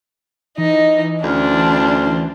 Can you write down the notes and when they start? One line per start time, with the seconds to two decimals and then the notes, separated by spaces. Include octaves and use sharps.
0.58 E3 D#4 D#5
1.24 D2 C#4 D4 C5